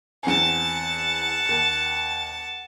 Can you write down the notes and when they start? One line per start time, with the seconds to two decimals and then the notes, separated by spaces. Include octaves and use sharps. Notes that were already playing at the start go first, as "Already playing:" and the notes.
0.23 E2 C4 F#5 G#5 A5
1.46 D#2 C#7